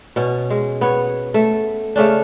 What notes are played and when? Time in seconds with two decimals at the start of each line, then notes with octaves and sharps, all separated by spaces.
0.16 B2 C#4
0.50 G#3
0.81 B3 C#5
1.34 A3
1.96 C#3 A3 C#4 D4